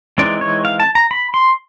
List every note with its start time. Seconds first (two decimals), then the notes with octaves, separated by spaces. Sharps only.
0.18 E3 G#3 C4 D#4 D5
0.41 C#5
0.65 F5
0.80 A5
0.95 A#5
1.11 B5
1.34 C6